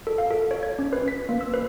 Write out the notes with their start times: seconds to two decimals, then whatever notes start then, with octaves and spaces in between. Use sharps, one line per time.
0.07 A4
0.18 F5
0.31 A4
0.51 C#5
0.63 G#6
0.79 C#4
0.93 B4
1.08 B6
1.29 A#3
1.41 E6
1.54 B4